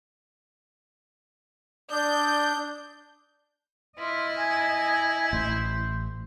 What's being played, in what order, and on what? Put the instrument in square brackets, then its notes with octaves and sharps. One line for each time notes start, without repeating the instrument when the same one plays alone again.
[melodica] D4 [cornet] D5 [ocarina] D#6 [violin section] G6
[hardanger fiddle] E4 [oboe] F4 [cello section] D#5
[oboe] G#5
[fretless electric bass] A1 [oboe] C5